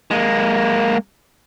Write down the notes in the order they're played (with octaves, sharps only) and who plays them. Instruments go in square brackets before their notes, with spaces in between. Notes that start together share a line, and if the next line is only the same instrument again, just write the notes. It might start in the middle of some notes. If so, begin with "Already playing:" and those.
[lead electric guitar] G#3 A#3